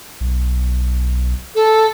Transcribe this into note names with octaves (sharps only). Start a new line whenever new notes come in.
B1
A4